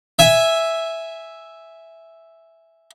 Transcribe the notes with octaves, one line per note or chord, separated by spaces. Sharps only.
E5 G#5